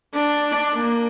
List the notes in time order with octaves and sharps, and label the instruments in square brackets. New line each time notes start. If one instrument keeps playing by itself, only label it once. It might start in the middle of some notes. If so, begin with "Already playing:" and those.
[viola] D4
A#3